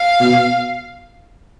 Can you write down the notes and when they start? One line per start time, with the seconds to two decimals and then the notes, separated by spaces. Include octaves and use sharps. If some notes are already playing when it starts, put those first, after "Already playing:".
Already playing: F5
0.20 B2